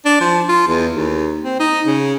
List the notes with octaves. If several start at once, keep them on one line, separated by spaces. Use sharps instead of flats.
D4
F3
F4
E2
D#2
C4
D#4
C#3